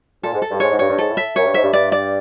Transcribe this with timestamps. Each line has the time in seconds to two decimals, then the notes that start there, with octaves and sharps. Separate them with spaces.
0.23 A#2 A4
0.33 G#2
0.42 A4
0.51 G2
0.60 G#2 C#5
0.70 G#2
0.79 G2 C#5
0.89 G2
0.98 G#2 A4
1.10 A2
1.17 E5
1.36 F#2 C#5
1.45 G2
1.54 G#2 E5
1.63 G2
1.73 G2 D5
1.92 D5